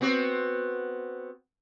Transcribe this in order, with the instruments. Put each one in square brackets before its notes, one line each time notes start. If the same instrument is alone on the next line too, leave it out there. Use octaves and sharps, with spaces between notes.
[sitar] B3 C4 F#4